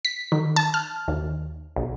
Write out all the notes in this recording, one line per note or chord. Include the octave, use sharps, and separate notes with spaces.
B6
D#3
A5
F6
D#2
B1